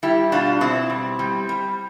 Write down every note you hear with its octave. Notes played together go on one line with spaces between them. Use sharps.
G3 E4 G4
B2 D4 F4
B2 C4 E4
G3
G3
G3